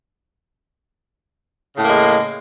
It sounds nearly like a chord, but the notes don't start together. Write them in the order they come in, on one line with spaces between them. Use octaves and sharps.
C#3 A2 A#3 G#3